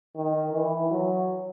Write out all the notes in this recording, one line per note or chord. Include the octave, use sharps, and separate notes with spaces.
D#3
E3
F#3